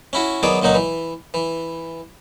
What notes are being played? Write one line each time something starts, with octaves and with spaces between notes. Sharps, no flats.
C#4 E4 F#4
D#3 F#3 B3 G#4 D5
C#2 A#2 F#3 D#4 F#5
E3
E3